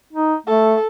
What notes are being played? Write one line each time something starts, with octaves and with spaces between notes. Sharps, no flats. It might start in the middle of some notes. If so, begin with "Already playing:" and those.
D#4
A3 A4